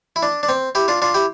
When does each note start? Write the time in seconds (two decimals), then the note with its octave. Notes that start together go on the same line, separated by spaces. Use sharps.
0.16 E4
0.23 D4
0.43 D4
0.49 C4
0.75 E4 G4
0.88 D4 F4
1.02 D4 F4
1.14 E4 G4